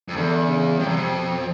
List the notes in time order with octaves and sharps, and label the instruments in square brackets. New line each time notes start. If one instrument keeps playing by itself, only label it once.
[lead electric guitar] F2
[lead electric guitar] E2 [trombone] D3
[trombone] C#3
[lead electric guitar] F2 [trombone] C3
[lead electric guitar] E2
F2
[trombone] B2